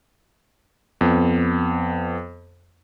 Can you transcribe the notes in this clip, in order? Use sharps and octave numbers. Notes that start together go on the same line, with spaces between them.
F2 B3